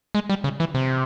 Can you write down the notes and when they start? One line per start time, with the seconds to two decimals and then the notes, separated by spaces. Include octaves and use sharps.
0.15 G#3
0.30 G3
0.44 C#3
0.60 E3
0.74 C3